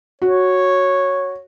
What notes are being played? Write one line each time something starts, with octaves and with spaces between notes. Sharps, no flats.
F#4 C#5